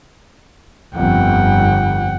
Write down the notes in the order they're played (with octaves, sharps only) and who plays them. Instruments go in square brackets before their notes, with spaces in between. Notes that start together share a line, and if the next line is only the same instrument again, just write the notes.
[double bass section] G1 F2 [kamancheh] F#5 G5